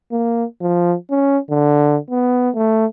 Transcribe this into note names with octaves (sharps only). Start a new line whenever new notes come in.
A#3
F3
C#4
D3
B3
A3